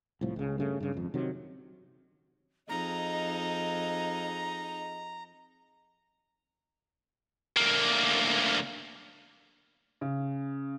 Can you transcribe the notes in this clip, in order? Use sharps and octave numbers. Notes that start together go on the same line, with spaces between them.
C2 A2 F3
C#2 C#3
G2 C#3 A3
G2 C#3
G#1 F2
C3 D#3 F#3
F2 D#4 G#4 D#5 A#5
D2 A#3
C#3